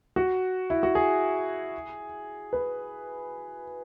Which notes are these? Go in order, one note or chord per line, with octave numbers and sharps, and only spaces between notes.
F#4
E4
F#4
G#4
B4